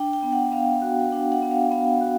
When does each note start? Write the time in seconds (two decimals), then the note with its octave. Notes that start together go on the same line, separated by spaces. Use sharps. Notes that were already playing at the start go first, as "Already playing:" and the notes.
Already playing: D4 G5
0.13 G5
0.23 B3
0.32 F#5
0.52 B3 F5
0.82 F#4
1.12 D4 F5
1.32 F#5
1.42 B3
1.51 F5
1.71 B3 F5
2.01 F#4